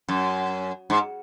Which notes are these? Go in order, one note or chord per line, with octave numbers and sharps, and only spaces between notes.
F#2
G#2